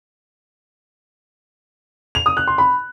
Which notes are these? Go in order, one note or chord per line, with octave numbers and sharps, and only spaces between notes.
F7
D#6
F#6
C6
B5